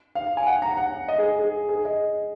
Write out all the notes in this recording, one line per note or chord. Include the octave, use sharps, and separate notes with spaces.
F5
G#5
F#5
A#5
F#5
D#5
G#4
G#4
G#4
D#5